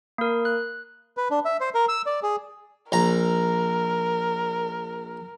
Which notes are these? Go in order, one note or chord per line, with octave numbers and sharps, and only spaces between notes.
A#3 A#4
F#6
B4
D4
E5
C5
A#4
E6
D5
G#4
A#1 A#4 A#5